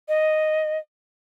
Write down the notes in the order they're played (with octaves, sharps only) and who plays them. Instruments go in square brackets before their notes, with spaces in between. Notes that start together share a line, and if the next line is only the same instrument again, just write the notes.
[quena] D#5